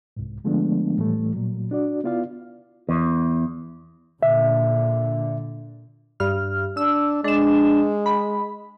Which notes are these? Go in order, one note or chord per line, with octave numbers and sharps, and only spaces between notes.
C2 G#2
D3 F3 G#3 A3 B3 D4
A2 E3 G3 A3
A#2 F#3
D4 F#4 D5
B3 E4 F4 D5 F5
E2
A#2 D3 E5
G2 F6
D4 E6
G#3 D4 E7
B5